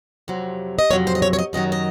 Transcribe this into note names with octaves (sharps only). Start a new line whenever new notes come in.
F2 C3 F#3
D#5
F2 C3 F#3 C#5
C5
D#5
C#5
C#5
D#5
F#2 D#3 F#3 D#5
D#5